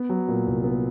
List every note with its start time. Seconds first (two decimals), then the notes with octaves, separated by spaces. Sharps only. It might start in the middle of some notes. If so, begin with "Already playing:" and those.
Already playing: B3
0.09 F#3
0.28 A#2
0.47 C2
0.64 B3